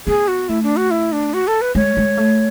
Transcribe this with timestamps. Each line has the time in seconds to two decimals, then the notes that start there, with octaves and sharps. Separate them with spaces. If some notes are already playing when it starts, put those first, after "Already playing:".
0.07 B3 G#4
0.28 F#4
0.49 A3 E4
0.63 D4
0.77 F#4
0.91 E4
1.12 D4
1.34 F#4
1.47 A4
1.61 B4
1.75 G#3 C#5
1.97 G#3
2.17 A3